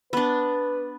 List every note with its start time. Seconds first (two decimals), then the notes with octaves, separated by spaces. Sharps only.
0.13 B3 D4 B4